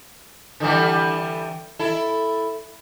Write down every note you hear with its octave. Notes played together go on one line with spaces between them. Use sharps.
D3 E3 G3
E4 A4